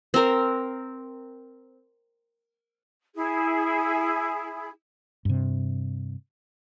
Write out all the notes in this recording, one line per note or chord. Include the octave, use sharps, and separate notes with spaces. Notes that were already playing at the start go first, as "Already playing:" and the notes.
C4 A#4
E4 G#4
G2 C3